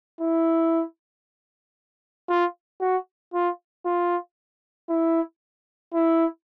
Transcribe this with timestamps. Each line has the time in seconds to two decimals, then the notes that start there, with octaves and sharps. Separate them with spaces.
0.21 E4
2.29 F4
2.81 F#4
3.33 F4
3.85 F4
4.89 E4
5.94 E4